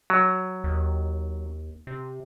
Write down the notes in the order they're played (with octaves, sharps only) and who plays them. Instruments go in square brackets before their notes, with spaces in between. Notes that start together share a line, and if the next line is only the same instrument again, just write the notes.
[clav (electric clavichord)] F#3
[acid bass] D#2
C3